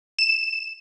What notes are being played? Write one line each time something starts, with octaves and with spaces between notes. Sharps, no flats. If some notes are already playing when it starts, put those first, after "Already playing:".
E7